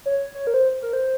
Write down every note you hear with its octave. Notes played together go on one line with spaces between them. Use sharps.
C#5
C#5
A#4
C5
A#4
C5